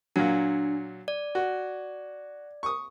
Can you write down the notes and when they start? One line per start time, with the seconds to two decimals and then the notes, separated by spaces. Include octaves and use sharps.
0.16 A#2 F#3 D4
1.08 D5
1.35 F#4
2.63 C#6 D#6